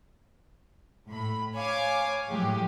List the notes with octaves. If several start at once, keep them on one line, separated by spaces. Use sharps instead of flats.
A2 B5
C#5 F5 G#5 D6
A2 F3 F#3 G#3 G4